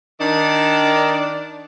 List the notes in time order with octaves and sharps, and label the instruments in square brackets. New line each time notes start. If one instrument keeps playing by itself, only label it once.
[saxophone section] D#3 D4